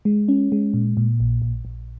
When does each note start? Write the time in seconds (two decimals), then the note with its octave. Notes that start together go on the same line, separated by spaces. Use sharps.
0.05 G#3
0.28 C#4
0.52 G#3
0.74 A#2
0.97 A#2
1.20 A#1
1.42 A#1
1.65 A#1